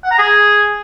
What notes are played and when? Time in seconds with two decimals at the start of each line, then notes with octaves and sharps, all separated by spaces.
0.04 F#5
0.11 A#5
0.19 G#4